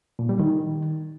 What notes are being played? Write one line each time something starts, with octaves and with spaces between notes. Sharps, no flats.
A#2
G3
D#3